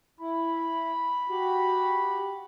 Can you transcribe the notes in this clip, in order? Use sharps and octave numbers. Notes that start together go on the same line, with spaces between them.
E4 B5
F#4 G4